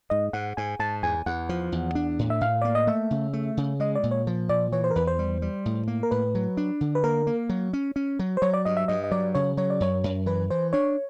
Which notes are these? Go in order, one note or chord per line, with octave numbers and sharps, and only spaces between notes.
G#2 D#5
G#2 F#5
G#2 G#5
G#2 A5
E2 G#5
E2 F#5
F3
E2
D4
A2
E5
A2 F5
A#3 D5
D#5
A3 E5
C#3
A3
C#3
G#3 D#5
D5
A#2
C#5
F3
A#2 D5
E3 C#5
C5
A#4
E2 B4
C5
G3
G3
A2
A#3
A#4
A2 B4
F#3
D4
D3
B4
A#3 A#4
A#3
F#3
C#4
C#4
F#3
C5
F#3 C#5
D5
G2 D#5
E5
G2 D#5
D#5
F#3 D5
C#3 C#5
F#3 C#5
D5
F#2 C#5
F#2
E3 B4
E3 C5
D4 C#5